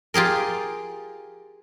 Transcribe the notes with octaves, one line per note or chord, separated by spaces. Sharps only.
F4 G4 G#4 A#4